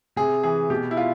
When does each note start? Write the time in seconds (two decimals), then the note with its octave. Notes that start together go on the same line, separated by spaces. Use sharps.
0.16 C3 G#4
0.44 E3 G#4
0.70 B2 G4
0.91 E4
0.97 F4